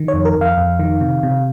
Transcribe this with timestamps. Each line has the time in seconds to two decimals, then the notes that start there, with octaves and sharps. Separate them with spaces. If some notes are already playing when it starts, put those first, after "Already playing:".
Already playing: D#3
0.08 C#5
0.14 F2
0.25 A#4
0.36 F2
0.41 F5
0.57 F2
0.79 D#3
1.01 C3
1.23 C3